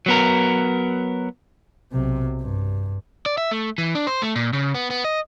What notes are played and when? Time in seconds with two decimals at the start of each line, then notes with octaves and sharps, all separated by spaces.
0.06 F#3 B3 A#4
1.92 B1 C3
2.42 G2
3.26 D5
3.38 E5
3.51 A3
3.78 E3
3.95 D4
4.07 C5
4.22 A3
4.35 A#2
4.53 C#3
4.75 B3
4.90 B3
5.04 D#5